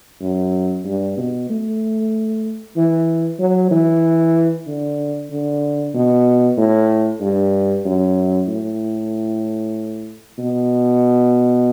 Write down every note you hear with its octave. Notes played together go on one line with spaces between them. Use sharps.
F#2
G2
B2
A3
E3
F#3
E3
D3
D3
B2
A2
G2
F#2
A2
B2